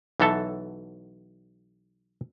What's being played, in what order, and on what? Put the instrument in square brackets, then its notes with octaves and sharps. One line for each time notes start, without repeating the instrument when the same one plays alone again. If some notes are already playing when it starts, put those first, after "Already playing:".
[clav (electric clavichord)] B1 E3 F#3 A4 E5 A5